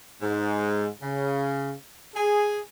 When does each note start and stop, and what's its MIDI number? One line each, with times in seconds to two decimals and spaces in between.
0.22 0.86 44
1.01 1.73 49
2.15 2.60 68